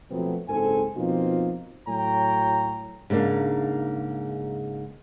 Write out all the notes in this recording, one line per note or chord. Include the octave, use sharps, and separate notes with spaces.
B2 F3 F#3 A3 B3 C4
F#1 G#2 C4 A4 G#5
B2 F3 A#3 C4 D#4 F4
A2 F#3 C#5 G5 A#5
G#2 C#3 A#3 D4 D#4